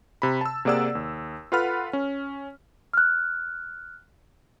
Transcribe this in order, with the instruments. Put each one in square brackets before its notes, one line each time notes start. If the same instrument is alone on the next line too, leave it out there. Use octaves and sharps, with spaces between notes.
[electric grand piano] C3 B5
A5 E6
C3 A#3 G#4 D5 F#5 E6
D#2
F4 A4 B4 F#5 B5 F6
C#4
[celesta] F6 F#6